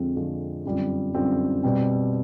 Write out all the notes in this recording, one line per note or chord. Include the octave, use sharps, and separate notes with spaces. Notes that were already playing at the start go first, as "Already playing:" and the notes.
Already playing: F2 D3 F3 G#3 C4
F2 D3 F3 G#3 C4
F#2 D3 G3 C4 F4
F#2 D3 G3 C4 F4
B2 G3 C4